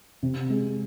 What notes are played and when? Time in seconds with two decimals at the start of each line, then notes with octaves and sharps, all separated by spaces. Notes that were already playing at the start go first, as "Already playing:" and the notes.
0.23 C3
0.50 G#3